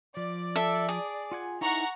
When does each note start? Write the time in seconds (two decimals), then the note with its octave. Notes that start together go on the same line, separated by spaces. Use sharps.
0.17 F3 D5
0.55 A4 E5
0.89 G#4
1.32 F4 F#5 G#5
1.61 D#4 E4 F#5 A#5 C#6